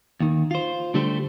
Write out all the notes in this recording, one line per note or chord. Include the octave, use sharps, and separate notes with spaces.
D#2 D#3
F4 C5
D3 G3 A3 G4 C5